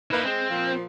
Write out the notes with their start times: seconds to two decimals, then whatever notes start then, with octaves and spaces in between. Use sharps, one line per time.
0.11 A#3 D#4 E4 B4
0.25 G#3 C4
0.49 A#2 F3